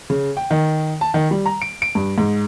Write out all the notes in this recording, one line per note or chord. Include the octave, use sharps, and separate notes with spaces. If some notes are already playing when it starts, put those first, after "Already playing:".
C#3
G5
D#3
A5
D#3
G3
A#5
D7
D7
G2
G#2